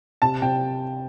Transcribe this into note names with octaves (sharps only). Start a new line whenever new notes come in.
C3 A5
C3 G5